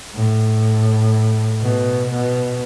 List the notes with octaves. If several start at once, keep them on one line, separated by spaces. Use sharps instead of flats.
A2
B2
B2